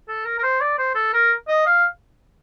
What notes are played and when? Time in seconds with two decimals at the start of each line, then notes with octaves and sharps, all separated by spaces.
0.08 A4
0.25 A#4
0.38 A#4
0.43 C5
0.61 D5
0.79 C5
0.95 A4
1.13 A#4
1.48 D#5
1.66 F5